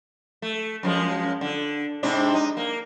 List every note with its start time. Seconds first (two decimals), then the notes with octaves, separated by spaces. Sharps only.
0.42 A3
0.83 F#2 F3 G#3
1.41 D3
2.03 G#2 C3 D4
2.34 D#4
2.57 A#3